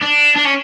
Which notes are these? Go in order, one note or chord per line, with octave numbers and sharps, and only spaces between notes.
D4
D4
C#4